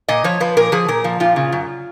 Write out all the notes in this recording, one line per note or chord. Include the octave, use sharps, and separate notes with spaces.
A#2 D#5
F3 C#5
F3 B4
A#2 A#4
F3 G#4
A#2 A#4
F3
A#2 F4
C#3
F#2